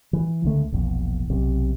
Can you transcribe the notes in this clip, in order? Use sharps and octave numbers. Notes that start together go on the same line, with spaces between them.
E3
C#2 D3 A3
E1 A#1 E2
B1 C3